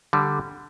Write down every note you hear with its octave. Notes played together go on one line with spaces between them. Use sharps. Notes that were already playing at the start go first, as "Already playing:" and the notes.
D3 G3